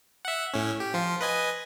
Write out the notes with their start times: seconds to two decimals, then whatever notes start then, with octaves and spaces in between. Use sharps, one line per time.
0.25 E5 F#5
0.54 A2 C#4
0.80 G4
0.94 F3 F4
1.21 B4 D#5 G#5